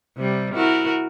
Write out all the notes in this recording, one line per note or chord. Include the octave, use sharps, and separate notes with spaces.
C3 G3
E4 F#4 A#4